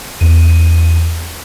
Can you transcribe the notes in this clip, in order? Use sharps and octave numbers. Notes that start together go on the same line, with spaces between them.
E2 D#7